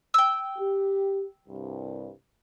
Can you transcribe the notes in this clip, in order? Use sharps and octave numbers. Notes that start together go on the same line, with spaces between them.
G5 E6
G4
C2 G2